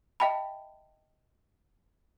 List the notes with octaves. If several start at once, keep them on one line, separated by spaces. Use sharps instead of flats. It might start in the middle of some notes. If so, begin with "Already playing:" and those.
D#5 E5 G5 A5 B5